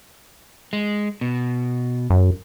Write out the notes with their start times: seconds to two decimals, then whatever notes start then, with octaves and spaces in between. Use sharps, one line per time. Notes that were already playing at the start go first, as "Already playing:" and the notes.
0.73 G#3
1.21 B2
2.10 F#2